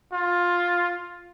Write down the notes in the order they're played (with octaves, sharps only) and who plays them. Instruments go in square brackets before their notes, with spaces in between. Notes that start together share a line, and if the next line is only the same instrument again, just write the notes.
[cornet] F4